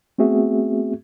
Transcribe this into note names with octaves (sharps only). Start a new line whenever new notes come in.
A3 B3 C4 F#4 G#4 E5